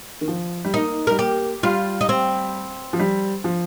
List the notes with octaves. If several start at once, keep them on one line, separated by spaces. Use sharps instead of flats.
D#3
F3
G3
A#3 D#4
G3 A#4
A#3 G4
G3 F4
D#4
C4
F3
G3
F3